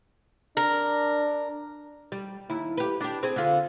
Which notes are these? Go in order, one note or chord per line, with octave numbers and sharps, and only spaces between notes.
D4 A#4
G3
D#2 E4
G4 B4
D4 G4
C4 G#4
D3 F4